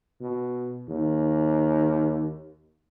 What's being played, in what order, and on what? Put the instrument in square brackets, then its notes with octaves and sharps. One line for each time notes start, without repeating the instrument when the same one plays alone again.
[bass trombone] B2
D#2